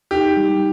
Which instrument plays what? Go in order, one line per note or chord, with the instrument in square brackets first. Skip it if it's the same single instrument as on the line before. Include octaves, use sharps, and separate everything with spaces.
[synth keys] D#4 [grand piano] G4
[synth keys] G3